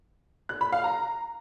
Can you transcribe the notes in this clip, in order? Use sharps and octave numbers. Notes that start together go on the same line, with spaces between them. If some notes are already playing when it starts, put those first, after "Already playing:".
F#6
B5
F5
A#5